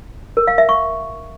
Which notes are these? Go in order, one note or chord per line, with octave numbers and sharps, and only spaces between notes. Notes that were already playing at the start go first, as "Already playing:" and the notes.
A#4
F5
E5
C#6